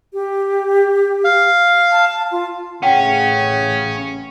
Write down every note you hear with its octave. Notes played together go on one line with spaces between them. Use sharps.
G4
F5
A5
F4
A1 C#3 C#4 F#5 G5